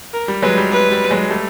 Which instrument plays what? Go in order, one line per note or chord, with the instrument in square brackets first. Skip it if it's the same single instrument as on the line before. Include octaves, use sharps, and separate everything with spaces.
[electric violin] A#4
[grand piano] G3
[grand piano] F#3 G#3 [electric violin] B4
[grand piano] G3
[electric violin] B4
[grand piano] G3
F#3 G#3
G3 A3